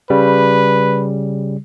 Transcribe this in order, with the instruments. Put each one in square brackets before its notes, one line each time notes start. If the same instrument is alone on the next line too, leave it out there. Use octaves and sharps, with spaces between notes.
[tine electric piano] C#3 G3 [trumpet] B4